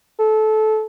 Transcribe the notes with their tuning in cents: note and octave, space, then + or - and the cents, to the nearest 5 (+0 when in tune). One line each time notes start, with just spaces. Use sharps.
A4 -20